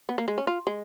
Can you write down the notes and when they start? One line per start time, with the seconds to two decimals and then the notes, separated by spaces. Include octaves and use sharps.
0.09 B3
0.18 A#3
0.28 G#3
0.38 C#4
0.47 F4
0.67 G#3